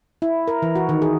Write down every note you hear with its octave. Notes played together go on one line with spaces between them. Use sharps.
E4
A#4
E3
F#4
D#3
G#4